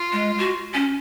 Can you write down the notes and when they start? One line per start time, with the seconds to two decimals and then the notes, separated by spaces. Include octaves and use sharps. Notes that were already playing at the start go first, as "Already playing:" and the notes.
Already playing: F4
0.13 G#3
0.39 F#4
0.74 C#4